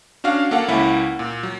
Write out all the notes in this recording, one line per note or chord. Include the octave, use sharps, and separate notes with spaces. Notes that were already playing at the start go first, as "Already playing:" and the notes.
C#4 D4 F#4 F5 F6
A#3 A4 F5 F#5
C#2 A#3 C#4 E4 F#5 B5
A#2
F#3